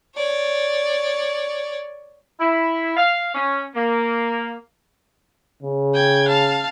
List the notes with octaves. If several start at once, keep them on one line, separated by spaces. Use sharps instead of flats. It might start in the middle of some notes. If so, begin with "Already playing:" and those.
C#5 D5
E4
F5
C#4
A#3
C#3
G5 G#6
F5 A5